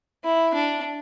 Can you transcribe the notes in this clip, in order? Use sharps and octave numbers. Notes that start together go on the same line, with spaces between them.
E4
D4